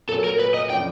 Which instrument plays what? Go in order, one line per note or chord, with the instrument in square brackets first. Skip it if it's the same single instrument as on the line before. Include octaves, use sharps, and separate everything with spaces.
[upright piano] A#2 F#3 A3 [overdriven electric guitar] A4
[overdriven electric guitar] A#4
B4
D#5
[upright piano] C#3 F3 A3 D4 [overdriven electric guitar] G5